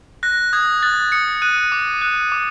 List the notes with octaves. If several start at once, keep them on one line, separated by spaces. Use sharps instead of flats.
F#6 A#6
D#6 G#6
F#6 A6
D#6 C#7
F#6 D#7
D6
F#6
D6